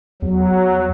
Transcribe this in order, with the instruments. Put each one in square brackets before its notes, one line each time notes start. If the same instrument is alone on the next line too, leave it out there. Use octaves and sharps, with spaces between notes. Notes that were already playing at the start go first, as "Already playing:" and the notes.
[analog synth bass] E2 [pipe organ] F#3